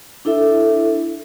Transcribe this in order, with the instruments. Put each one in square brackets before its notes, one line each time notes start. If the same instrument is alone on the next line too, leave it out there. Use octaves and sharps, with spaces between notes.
[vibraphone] D4 E4 A4 E5